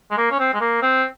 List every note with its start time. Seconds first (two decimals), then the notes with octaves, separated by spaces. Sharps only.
0.11 G#3
0.17 A#3
0.31 C#4
0.39 C4
0.54 G#3
0.60 A#3
0.82 C4